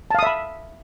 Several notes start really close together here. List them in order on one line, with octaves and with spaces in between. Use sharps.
A5 F5 D#6 E5 B5